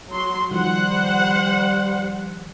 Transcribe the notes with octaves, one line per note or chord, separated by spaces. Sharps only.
F#3 C6
D#3 F3 G3 C5 F#5